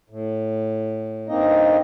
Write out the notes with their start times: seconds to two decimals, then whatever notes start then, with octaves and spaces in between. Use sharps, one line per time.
0.10 A2
1.28 G2 A#3 C4 D#4 D#5